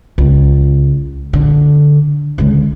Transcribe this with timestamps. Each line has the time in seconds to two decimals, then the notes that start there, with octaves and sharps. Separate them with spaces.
0.18 C#2
1.33 D3
2.38 C#2 D3